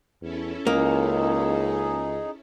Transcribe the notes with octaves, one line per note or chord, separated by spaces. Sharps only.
E2 C#4 E4 A4
C#2 A#3 D#4 G#4